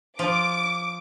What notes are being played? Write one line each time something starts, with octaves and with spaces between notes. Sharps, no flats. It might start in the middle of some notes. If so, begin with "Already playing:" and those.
F3 D6